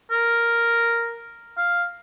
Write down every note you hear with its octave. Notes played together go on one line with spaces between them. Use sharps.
A#4
F5